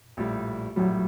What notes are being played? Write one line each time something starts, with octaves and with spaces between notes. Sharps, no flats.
A#1 A2 G3
A#1 A2 F#3 G3